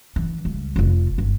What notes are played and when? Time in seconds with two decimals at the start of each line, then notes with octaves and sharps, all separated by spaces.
0.16 E3
0.45 C#2 G3
0.76 F1 F4
1.18 G1